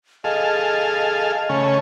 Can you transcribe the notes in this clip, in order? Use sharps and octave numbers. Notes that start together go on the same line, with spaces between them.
G#4 A4 D#5 F5
C#3 A3 C#4